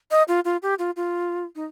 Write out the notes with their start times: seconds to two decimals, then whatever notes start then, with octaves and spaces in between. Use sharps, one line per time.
0.11 D#5
0.28 F4
0.45 F4
0.62 G4
0.79 F4
0.96 F4
1.56 D#4